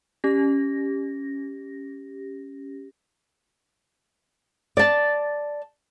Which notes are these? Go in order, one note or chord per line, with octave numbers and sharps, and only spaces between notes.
C#4 G4 A#6
D5 A5